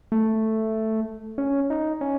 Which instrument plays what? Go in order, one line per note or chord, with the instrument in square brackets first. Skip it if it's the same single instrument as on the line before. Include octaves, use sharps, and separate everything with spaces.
[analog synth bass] A3
C#4
D#4
C#4